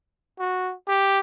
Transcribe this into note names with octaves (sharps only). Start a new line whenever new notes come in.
F#4
G4